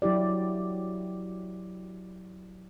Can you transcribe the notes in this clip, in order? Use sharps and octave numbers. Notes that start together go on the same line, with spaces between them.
F#3 E4 G4 D5